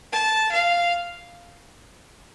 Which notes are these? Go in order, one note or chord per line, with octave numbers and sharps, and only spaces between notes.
A5
F5